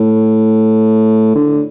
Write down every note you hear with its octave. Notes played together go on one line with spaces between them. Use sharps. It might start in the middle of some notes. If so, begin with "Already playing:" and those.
Already playing: A2
D3